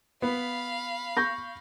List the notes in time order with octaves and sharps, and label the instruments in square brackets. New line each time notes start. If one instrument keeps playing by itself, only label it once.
[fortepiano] B3 [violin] F5 B5
[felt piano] C#6 G6 A#6